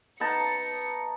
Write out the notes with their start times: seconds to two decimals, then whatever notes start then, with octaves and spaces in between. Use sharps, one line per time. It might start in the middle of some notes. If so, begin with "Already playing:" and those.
0.20 B3 D#4 A5 C#7